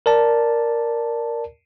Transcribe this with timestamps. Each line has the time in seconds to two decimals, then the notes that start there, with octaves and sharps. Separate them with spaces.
0.06 A#4 D5 A5